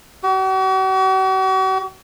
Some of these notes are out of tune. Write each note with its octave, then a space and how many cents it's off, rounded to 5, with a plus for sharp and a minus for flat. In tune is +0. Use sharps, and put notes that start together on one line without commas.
F#4 +45